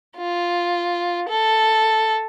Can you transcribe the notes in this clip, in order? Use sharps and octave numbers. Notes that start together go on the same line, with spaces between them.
F4
A4